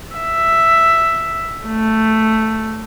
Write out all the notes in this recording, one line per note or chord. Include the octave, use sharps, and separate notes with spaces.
E5
A3